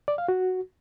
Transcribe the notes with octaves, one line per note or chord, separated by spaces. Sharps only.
D5
F5
F#4